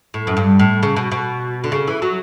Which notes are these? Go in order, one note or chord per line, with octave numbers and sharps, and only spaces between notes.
A2
F#2
G2
A2
C#3
B2
B2
D3
C#3
E3
F#3